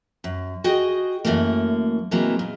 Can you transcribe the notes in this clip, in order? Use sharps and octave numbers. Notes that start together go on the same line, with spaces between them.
F#2
F#4 G#4 D#5 G5
F#2 A#2 E3 A3 A#3
C3 E3 F#3 G#3 A#3
A#2